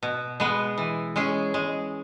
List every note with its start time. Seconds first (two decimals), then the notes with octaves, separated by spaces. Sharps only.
0.03 B2
0.40 G#3 B3
0.78 E3
1.16 G#3 C#4 G#4
1.54 G#3